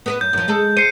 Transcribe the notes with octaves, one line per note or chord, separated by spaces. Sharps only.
B3 A#4 B4
F#2 G6
F#2 F3
G#3 G#4 A4
C5 C7 C#7 D#7